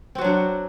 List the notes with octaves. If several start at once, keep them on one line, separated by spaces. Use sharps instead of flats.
F#3 C4 D4 F#4